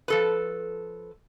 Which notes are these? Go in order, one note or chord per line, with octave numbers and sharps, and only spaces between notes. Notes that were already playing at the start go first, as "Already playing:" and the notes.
F3 A4 B4